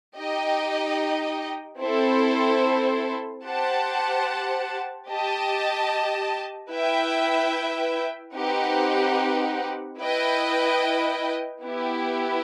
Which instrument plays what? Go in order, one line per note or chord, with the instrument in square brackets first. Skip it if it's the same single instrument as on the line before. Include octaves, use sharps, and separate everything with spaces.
[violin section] D#4 G4 D#5 G5
C4 E4 A4 C5
G4 C5 F#5 A5
G4 D#5 A5
E4 B4 E5 G5
C4 D#4 G4 B4 F#5
E4 B4 D#5 G5
B3 E4 G4